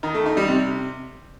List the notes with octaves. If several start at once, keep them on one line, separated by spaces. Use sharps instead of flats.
D#3
A3
D#4
G3
C3